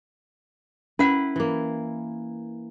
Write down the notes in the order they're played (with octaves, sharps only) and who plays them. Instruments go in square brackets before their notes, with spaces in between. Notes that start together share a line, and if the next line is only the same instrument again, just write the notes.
[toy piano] C#4 F#5 [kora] E4 A#4 B4
[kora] E3 A#3